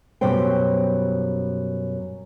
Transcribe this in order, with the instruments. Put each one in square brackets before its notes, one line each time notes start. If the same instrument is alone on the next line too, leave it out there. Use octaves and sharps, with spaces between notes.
[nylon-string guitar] F#2 B2 G3 C5 G5